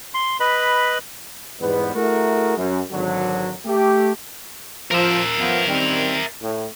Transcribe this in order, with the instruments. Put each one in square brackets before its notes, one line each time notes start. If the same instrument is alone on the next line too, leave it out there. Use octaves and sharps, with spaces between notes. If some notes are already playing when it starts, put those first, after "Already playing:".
[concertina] C6
B4 D#5 B5
[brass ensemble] E2 G#2 G3 G#3 B3
A3 E4 F#4 G#4 A#4
F#2
G#1 D3 F#3
A3 G4
[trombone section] F3 [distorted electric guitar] A#4 E5
[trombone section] F3 B3
D#3 G3 C4
A2